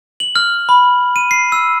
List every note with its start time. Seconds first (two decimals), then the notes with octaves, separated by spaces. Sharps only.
0.20 F#7
0.36 F6
0.69 B5
1.16 D#7
1.31 C7
1.52 E6